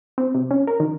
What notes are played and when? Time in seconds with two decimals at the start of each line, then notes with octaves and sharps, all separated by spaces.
0.18 C4
0.35 C3
0.51 C#4
0.67 A#4
0.80 D#3